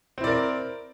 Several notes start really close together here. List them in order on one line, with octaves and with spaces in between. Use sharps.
C4 E4 D5 A#4